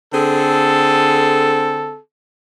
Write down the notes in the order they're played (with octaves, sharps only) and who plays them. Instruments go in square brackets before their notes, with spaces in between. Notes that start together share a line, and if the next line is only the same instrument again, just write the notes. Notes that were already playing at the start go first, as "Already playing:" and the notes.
[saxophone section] D3 C4 G#4 [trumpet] A4